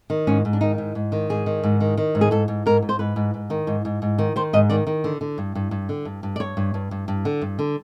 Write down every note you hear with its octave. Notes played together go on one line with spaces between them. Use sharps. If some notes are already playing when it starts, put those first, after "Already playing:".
D#3
G#2 C#4
G#2
D4
D#3 D#4
G#2
G#2
D#3
G#2 G#4
D#3
G#2
D#3
D#3
G#2
G#4
G#2 A4
G#2
G#2 A#4
G#2
C5
G#2 B4
G#2
G#2
D#3
G#2
G#2
G#2
D#3
D#3 C5
G#2 D#5
D#3 D5
D#3
D3
D3
G2
G2
G2
D3
G2
G2
D5
G2 C#5
G2
G2
G2
G2
D3
G2
D3